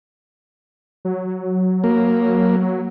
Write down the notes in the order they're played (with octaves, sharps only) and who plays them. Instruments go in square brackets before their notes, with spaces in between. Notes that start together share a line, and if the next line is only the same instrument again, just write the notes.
[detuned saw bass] F#3
[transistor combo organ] A#3